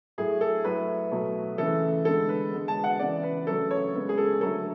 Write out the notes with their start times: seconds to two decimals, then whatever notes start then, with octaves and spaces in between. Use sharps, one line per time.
0.18 A2 F#3 A3 G#4
0.41 A4
0.64 A2 F#3 A3 B4
1.11 B2 F#3 A3
1.58 C#3 E3 A3 A4
2.05 D3 G#3 B3 A4
2.29 B4
2.52 D3 G#3 B3
2.68 A5
2.84 F#5
2.99 C#3 E3 B3 D5
3.23 B4
3.47 C#3 F#3 A3 A4
3.71 C#5
3.94 C#3 G#3 B3
4.09 G#4
4.18 A4
4.41 D3 F#3 A3 A4